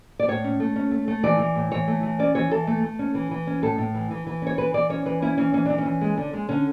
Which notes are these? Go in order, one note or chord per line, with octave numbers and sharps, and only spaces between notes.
D5
A2 C#5
C#4
A3
C#4
A3
A3
E3 D5
E3
A2
E3 C#5
A3
E3
C#4 D5
E3 C#5
E3 A4
A3
A3
C#4
E3
E3
C#4
A2 A4
A2
E3
E3
E3
C#4 C#5
E3 B4
E3 D5
C#4 C#5
E3 B4
C#4 E4
E3 C#4
E3 C#4
E3 D4
C#4
E3
G#3
D3
G#3
D3 C#4